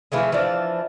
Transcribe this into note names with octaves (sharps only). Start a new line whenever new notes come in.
E3 F3 A3 G#4
E3 F3 D4 D5